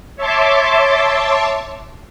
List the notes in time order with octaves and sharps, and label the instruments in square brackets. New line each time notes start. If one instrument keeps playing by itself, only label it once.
[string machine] C#5 E5 A5 C6 D6